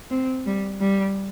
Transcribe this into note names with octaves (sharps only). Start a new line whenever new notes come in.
C4
G3
G3